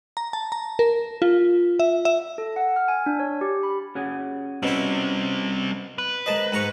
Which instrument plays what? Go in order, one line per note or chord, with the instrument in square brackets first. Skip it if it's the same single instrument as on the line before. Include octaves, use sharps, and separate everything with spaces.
[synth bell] A#5
A5
A#5
A#4
F4
E5
E5
[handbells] A4
F#5
F6
G#5
D4
C#5
G4
B5
[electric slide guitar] C#4 F#4 G#4
[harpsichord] B2 E4 [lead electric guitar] G3 C4 [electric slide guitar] C#4
[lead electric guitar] B4
[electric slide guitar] G#3 A#4 C5 [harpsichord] D#5 A5
[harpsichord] G#2 A#5 C#6